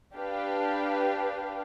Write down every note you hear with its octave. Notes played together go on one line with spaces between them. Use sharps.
D4 G4 B4 F5